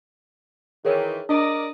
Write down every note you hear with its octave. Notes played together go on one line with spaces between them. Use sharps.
D#3 E3 G#4 A#4 C#5
D4 A#4 D5 D#5